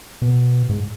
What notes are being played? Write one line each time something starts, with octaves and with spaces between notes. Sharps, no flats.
B2
G#2